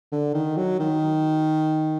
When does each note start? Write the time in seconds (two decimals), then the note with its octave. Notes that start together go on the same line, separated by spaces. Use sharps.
0.12 D3
0.34 D#3
0.57 F#3
0.79 D#3